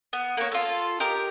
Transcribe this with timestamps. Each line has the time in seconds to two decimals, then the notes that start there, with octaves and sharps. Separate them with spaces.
0.13 B3
0.37 A#3 C#5
0.52 F4 A4
1.00 G4 A#4 D#5